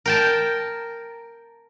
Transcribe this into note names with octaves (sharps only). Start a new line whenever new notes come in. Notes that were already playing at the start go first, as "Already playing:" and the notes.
A#4 G5 A5